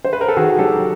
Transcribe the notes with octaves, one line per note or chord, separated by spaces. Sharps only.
C5
B4
A#4
A4
D#3 F#4 G#4
F#3 G4 A4